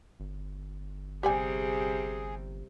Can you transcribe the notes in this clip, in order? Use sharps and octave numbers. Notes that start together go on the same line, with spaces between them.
G1
C3 G3 G4 G#4 D5 G#5